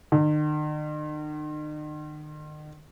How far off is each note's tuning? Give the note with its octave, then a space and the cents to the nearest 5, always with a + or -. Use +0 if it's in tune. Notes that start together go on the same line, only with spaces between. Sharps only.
D#3 -40